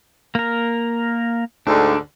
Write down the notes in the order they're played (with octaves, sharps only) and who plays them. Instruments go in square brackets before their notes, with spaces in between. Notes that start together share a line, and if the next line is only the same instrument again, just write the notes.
[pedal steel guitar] A#3 A#4
[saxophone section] D2 G#2 D3 [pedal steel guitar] D4